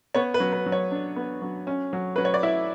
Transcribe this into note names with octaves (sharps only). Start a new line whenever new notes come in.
B3 C#5
B4
F#3
B4
F#3
C#5
D4
B3
F#3
C#4
F#3
F#3 B4
C#5
D5
E4 E5